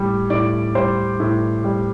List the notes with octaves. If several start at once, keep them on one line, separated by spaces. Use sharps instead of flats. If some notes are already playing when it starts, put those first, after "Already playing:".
Already playing: A2 G3
A2 D5
G3 C5
A2
G3